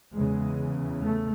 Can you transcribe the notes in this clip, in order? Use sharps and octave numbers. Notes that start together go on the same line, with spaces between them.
E2 C#3 G#3
A3